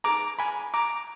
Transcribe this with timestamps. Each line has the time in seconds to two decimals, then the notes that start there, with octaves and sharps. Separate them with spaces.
0.04 D#4 G#4 B4 A#5 D6
0.39 G#5 B5
0.74 A#5 D6